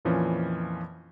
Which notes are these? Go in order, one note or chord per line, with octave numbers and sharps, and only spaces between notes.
F2 A#2 E3 F3 C#4